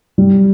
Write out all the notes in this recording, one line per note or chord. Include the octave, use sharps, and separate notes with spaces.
G3